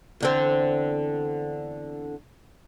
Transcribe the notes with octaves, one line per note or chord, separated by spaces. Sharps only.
E2 D3 C4